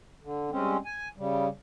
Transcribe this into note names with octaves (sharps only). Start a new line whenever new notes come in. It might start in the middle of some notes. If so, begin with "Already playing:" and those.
D3
G2 G#3 C4 C#4
G#5
C#3 G3